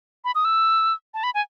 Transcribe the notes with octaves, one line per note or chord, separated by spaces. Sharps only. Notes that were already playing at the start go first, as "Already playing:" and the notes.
B5
D#6
E6
A5
B5
G#5